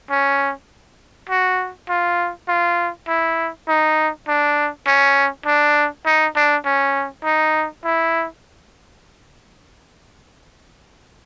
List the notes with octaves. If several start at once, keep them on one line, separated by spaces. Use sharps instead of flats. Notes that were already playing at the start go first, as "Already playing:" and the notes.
C#4
F#4
F4
F4
E4
D#4
D4
C#4
D4
D#4
D4
C#4
D#4
E4